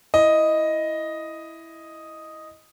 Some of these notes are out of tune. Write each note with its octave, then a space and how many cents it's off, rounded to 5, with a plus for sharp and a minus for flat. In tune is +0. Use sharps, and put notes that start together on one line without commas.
E4 +0 D#5 +0